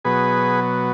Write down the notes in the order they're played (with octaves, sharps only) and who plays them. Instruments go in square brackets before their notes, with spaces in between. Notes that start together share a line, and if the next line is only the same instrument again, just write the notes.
[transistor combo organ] B2 F#3 B3 G#4 B4